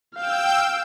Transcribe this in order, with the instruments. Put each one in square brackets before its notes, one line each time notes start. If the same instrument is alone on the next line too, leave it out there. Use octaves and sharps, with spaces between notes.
[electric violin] F5 [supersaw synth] G5 E6 G6